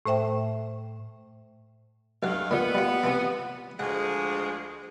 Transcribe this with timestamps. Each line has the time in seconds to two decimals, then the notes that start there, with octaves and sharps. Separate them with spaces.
0.06 A2 A3 C5 E5 G5
2.23 B1 G2 A3 F5 F#5
2.51 A#2 D3 B3
2.75 G3 F4
3.03 C3 E3 C4
3.79 D2 F3 G#3 F#5